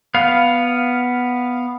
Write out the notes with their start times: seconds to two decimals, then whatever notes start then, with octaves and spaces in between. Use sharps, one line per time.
0.14 B3 F5